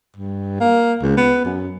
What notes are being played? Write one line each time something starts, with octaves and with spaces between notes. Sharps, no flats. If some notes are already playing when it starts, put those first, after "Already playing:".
G2
A#3
C#2
B3
F#2